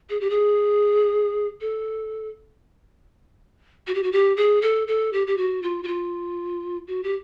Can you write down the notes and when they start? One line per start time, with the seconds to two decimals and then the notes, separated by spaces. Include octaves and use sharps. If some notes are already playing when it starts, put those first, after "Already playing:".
0.10 G#4
0.21 G4
0.30 G#4
1.61 A4
3.87 F#4
3.95 G4
4.03 F#4
4.12 G4
4.37 G#4
4.62 A4
4.88 A4
5.13 G4
5.27 G4
5.37 F#4
5.63 F4
5.83 F#4
5.87 F4
6.88 F#4
7.03 G4